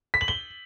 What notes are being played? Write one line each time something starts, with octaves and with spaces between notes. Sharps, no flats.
B6
F#7
G7